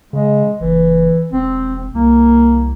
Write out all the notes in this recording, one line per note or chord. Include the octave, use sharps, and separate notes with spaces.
C#3 G#3
F#1 E3
E1 C4
C2 A#3